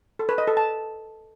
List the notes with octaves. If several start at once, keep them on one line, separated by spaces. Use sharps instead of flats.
A4
B4
D#5
A4
A5